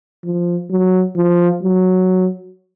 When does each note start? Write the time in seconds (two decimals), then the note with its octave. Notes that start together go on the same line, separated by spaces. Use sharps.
0.25 F3
0.71 F#3
1.16 F3
1.63 F#3